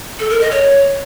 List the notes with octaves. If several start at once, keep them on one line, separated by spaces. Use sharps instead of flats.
A4
A#4
D#5
C#5